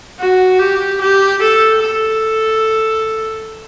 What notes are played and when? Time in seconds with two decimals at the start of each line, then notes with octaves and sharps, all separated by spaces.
0.19 F#4
0.59 G4
1.01 G4
1.41 A4
1.83 A4